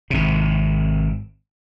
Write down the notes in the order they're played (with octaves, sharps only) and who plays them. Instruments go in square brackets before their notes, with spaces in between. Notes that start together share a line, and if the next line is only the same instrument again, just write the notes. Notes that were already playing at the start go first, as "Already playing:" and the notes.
[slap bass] G#1 C3